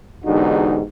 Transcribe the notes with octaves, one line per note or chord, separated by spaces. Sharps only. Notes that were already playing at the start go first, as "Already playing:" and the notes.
E2 G#2 D3 D#4 F#4 G4